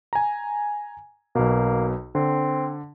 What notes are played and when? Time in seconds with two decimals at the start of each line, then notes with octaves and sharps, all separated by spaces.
0.13 G#5 A#5
1.35 B1 B2 A#3
2.15 D3 C4